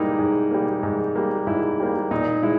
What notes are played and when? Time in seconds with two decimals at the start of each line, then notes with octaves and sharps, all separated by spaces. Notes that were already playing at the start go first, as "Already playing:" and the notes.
Already playing: G#2 G3 A#3 D#4 E4
0.19 G#2
0.51 G3 A#3
0.83 G#2
1.15 G3 A#3
1.47 G#2 E4
1.80 G3 A#3
2.11 A#2 D#4
2.43 G#3 E4